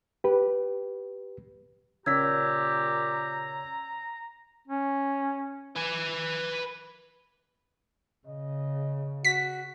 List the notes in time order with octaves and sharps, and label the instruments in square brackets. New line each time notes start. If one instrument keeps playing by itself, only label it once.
[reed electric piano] G4 B4
[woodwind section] A#2 G4 [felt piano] C#3 C#4 B6 [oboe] A#5 [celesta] E6 G#6
[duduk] C#4
[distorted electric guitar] B4 G#5
[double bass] C#3 [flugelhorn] D#5
[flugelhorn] F#4 [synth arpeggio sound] B6